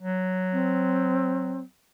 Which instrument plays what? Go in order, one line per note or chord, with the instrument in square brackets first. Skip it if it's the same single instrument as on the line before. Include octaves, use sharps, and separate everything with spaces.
[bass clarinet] F#3
[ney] C4